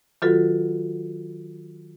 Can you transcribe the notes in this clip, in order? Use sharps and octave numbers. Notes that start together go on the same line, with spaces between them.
D#3 F#3 F4 F#4 A4 B4